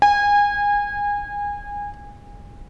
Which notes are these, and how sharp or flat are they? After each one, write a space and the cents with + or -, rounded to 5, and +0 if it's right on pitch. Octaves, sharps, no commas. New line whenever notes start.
G#5 -25